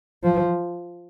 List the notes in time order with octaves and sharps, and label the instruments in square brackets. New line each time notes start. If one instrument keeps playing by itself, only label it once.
[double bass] F3